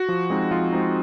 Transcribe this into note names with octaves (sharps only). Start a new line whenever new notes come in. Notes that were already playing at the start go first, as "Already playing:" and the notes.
Already playing: F#4
F3
G#3 C4 D#4
F3 F4
G#3 C4 D#4